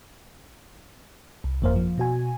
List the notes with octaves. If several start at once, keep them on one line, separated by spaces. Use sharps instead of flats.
C2
G1 F2 A#3 A#4 C5 F5
F3
B2 F#4 G#5